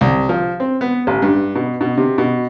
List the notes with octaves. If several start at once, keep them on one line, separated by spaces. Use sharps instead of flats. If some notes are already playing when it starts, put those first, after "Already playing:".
C2
F3
C4
B3
A1
G2
B2
B2
C3
B2